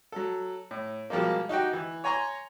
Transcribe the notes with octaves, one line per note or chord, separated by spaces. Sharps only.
F#3 A4
A2
B2 F3 G3 G#3 A#3
D#4 F#4 G4 G5
E3
C#5 G#5 A#5 C6 C#6